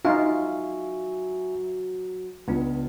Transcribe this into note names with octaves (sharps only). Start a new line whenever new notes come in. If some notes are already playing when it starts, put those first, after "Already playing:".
F#3 D#4 F4 E5 G#5 C#6
C#2 C#3 B3 D4